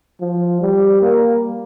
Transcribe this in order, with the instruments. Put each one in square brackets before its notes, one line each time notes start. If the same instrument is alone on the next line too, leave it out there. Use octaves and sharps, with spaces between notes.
[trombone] F3
G3
A#3